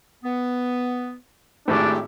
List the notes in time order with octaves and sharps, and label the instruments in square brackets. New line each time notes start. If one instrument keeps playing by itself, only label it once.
[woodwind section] B3
[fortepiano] G#1 A2 [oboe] D4 [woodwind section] G4